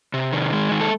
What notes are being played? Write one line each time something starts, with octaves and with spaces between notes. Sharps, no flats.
C3
D#3
G#3
D#3
A4